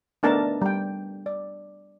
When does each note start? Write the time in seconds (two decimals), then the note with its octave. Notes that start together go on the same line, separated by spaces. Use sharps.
0.23 A3 B3 D4 D#4 A#4 A5
0.62 G3 G5
1.26 D5